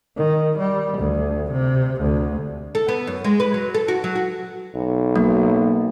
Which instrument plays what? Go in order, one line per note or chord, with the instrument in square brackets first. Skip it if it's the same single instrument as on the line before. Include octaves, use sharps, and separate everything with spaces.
[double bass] D#3
G3
D2
C3
D2
[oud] A4
B3
F#2
G#3
B4
F#3
A4
F#4
F#3
F#4
[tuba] B1
[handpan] F#3 [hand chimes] A#3